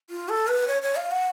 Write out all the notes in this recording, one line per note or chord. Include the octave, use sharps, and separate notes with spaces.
F4
A4
B4
C#5
C#5
F5
F#5